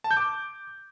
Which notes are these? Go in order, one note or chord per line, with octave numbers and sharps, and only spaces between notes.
A5
G6
D6